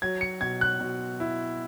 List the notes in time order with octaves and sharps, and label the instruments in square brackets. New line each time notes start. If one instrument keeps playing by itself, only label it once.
[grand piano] F#3 G#6
C#7
B2 G#6
F#6
B2
E4